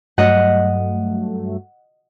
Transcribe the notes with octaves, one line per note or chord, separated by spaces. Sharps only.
G2 F#3 A3 D#5 F#5